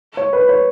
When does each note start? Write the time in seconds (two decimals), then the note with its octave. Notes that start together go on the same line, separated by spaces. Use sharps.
0.17 C#5
0.33 B4
0.49 C#5